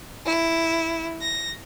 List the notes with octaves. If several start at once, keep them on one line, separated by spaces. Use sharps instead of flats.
E4
A#6